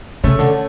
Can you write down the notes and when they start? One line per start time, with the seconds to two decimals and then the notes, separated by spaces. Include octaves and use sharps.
0.24 C#3 A3 C#4
0.39 D3